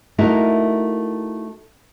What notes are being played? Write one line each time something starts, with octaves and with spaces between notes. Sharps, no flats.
A3 A#3 D#4 E4 F#4 A#4